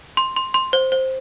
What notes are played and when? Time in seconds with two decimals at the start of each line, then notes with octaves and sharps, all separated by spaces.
0.17 C6
0.36 C6
0.54 C6
0.73 C5
0.92 C5